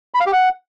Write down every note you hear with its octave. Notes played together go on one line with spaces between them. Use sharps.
B5
F5
G4
F#5